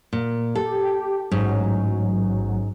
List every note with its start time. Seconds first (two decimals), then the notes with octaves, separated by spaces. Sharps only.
0.13 A#2
0.55 G4 A4
1.32 A1 G#2 F#3 C#4